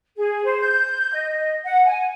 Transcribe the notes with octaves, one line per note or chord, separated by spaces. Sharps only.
G#4
C5
G6
D#5
D#5
F#5
G#5